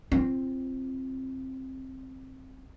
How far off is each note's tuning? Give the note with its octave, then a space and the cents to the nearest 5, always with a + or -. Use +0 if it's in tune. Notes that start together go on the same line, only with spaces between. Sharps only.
C4 +10 F4 -25